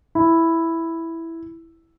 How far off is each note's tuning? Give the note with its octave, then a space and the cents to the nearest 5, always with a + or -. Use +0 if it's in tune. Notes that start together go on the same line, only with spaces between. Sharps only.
E4 +0